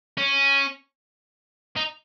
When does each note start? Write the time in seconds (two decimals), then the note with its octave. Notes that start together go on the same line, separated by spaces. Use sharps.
0.18 C#4
1.76 D#4